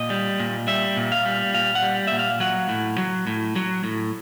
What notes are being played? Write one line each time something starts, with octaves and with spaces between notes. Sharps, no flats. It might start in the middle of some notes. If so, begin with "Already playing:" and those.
Already playing: A#2 D#5
G3
A#2
G3 E5
A#2
F5
G3
A#2 F5
F#5
G3
A#2 E5
F5
F#3 F#5
A2
F#3
A2
F#3
A2